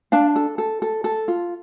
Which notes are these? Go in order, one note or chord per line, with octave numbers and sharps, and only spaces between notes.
D4 F5 A5
A4
A4
A4
A4
F4